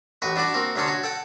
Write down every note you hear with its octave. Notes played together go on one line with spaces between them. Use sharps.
A1 F#4 B4
D4 E4 F#4 D5
A#3 C4 F#4
D2 F#3 C#4 D4 A4 C6
F#4 C#5
A4 F#5 G5